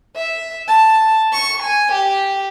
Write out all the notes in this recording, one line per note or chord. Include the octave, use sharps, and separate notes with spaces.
E5
A5
C#6
G#5
G4